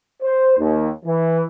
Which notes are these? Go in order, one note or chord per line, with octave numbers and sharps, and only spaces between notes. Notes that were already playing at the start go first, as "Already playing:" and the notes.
C5
D#2
E3